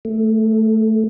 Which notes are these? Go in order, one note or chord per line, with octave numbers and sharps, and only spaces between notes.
A3